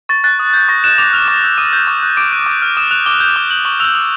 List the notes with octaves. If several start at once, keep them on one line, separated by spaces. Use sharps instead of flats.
C#6 A6
F#6 A6
D#6
G6
C#6 A#6
F#6 E7
D6 F7
F6 F7
C#6 E7
E6 G6
D#6 D#7
G6
C#6
F#6
D6 D7
F#6 D#7
D6
F6
D#6 E7
F#6 F7
D6 G7
G6
D6 G7
G6 F#7
C#6 F#7
E6 G6 F7
D#6 F7